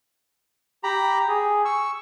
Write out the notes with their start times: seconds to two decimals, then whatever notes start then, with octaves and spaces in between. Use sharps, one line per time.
0.84 G4 A#5 B5
1.28 G#4
1.65 C#6 E6